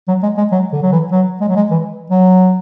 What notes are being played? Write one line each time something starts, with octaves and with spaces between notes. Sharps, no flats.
F#3
G#3
G#3
F#3
D3
F#3
E3
F#3
G#3
F#3
G#3
E3
F#3